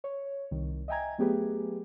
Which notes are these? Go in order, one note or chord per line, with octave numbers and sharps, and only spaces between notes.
C#5
C2 D#3
D#5 E5 G5 G#5 A#5 G#6
F#3 A3 B3 G4 G#4 B4